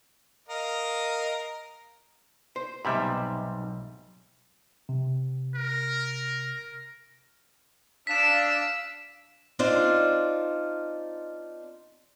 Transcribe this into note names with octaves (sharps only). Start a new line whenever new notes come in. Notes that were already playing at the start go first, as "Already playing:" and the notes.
A#4 D#5 F5
C5
B1 G#2 C3 G3 E5 B5
C3
A#4
D4 F5 E6 B6 E7
C4 D4 D#4 F4 C5 D5